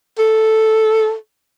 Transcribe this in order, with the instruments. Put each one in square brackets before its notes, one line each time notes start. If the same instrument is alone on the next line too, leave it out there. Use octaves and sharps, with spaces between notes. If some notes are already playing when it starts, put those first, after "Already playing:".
[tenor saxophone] A4